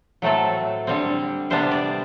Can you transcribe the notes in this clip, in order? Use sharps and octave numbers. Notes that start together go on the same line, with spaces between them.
A2 F#3 A3 C4 A4
D3 G3 C4
C3 G3 B3 D4 C5
D5